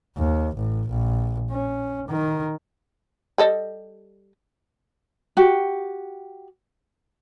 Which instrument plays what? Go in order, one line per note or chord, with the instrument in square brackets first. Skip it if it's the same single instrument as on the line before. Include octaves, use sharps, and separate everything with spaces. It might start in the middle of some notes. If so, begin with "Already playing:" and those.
[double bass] D#2
A1
A#1
C#4
D#3
[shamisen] G3 A4 D#5
[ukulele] F#4 G4